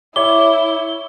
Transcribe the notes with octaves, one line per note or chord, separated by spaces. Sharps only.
E4 C#5 E5 D6 G7